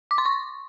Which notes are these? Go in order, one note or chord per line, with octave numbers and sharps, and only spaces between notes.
D6
C6
C#6